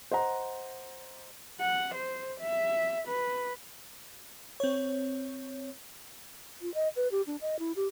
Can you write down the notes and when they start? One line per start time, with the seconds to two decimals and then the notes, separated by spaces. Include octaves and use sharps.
0.11 C5 D#5 F#5 A#5
1.60 F#5
1.95 C5
2.41 E5
3.08 B4
4.60 C4 C#5
6.62 F4
6.74 D#5
6.96 B4
7.12 G4
7.27 D4
7.41 D#5
7.59 E4
7.76 G4